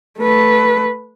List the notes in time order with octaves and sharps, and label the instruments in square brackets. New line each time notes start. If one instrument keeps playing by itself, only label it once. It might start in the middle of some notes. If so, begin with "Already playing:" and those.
[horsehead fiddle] A3 B4